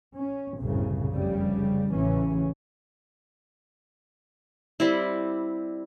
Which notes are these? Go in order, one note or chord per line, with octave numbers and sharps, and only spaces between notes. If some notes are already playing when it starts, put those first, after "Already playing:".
C#4
G1 C2 F#2 A2 C#3
F1 C#3 G3
A1 C#3 E3 C#4
G3 C4 E4